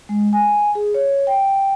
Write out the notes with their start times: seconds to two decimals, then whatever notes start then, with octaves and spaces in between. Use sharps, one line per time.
0.09 G#3
0.33 G#5
0.75 G#4
0.94 C#5
1.27 G5